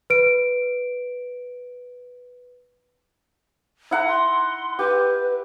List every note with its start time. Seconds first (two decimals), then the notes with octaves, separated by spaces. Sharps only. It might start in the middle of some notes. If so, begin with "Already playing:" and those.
0.10 B4 D7
3.91 E4 F#5 A#5
4.08 C6
4.79 G4 B4